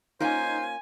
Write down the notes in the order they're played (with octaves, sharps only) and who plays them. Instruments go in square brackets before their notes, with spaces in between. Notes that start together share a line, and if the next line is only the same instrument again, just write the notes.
[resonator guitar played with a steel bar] A#3 C#4 F4 [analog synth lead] D#4 [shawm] C5 [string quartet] G#5